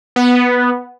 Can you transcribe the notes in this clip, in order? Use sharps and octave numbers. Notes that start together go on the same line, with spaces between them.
B3